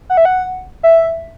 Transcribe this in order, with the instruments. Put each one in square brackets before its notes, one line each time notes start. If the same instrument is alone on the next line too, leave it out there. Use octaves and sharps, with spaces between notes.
[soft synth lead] F#5
E5
F#5
E5